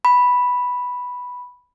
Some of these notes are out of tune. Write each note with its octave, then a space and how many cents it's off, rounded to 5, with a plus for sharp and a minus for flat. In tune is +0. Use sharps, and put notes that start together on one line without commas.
B5 +0